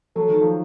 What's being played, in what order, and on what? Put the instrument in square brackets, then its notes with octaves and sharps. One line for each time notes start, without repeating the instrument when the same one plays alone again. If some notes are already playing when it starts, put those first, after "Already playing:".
[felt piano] F#3 [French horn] A4
[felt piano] D#3
F3